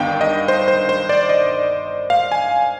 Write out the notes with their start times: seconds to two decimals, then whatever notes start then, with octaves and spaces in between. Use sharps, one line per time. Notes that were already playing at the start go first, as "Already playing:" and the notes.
Already playing: G1 G2 D#3 B3 D4 F5 G5
0.21 D#5
0.48 C5
0.68 C5
0.89 C5
1.09 D5
1.29 D#5
2.10 F5
2.32 G#5